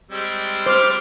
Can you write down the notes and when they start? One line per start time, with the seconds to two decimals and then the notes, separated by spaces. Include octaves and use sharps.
0.11 G3 G#3 C4
0.66 C5 D6 F6